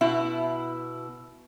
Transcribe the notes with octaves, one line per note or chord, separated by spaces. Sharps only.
B2 E4